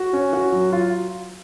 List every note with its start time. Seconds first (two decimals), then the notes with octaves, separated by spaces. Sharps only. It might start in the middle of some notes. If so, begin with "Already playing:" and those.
Already playing: F#4
0.13 C#4
0.33 F#4
0.52 F#3
0.72 F4